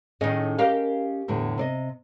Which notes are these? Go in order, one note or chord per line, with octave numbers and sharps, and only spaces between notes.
A2 D#3 C#4 G#4 D#5
G4 A#4 F5
E2 A2 D3
C3 D5 D#5